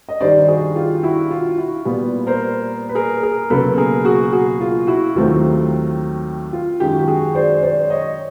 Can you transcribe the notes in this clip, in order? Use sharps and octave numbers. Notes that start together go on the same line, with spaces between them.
D#5
G2 D#3 G3 C5 D5
F#4 G#4
F4 G4
E4 F#4
F4
E4 F#4
A#2 G3 B3
A#4 C5
B4
G#4 A#4
G#4 A#4
C#2 B2 F#3 A#3 A4 B4
G#4 A#4
F#4 G#4
F#4 G#4
F4
E4 F#4
D#2 D#3 F#3 A3 C4 F4
F4
F#2 D#3 G#3 F4 G4
F#4
G4
F#4 G#4
C5 D5
C#5
C5 D5
C#5 D#5